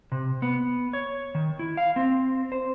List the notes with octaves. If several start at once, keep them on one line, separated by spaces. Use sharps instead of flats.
C3
B3
C#5
D#3
E4
F5
C4
C5